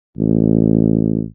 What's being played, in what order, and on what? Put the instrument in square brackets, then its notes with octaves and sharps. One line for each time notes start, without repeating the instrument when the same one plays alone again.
[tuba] A1